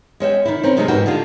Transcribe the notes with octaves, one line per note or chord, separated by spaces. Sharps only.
G#3 C#4 E5 G5
D#3 E4
C4 C#4 A#4 C#5
C3 D#3 F#3 G#3 A3 C#4
G#2 E3 E4 F#4 A#4 G5
D3 D#3 D4 F4 G4